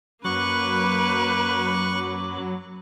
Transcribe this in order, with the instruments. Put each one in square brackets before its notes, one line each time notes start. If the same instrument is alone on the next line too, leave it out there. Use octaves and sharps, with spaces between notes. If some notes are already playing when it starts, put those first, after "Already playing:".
[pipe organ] F#2 B5 D6 [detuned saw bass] F#3 [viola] A#3 B4 [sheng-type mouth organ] C#6 F#6